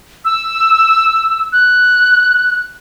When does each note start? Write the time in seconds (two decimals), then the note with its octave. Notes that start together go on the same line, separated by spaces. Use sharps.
0.25 E6
1.53 F#6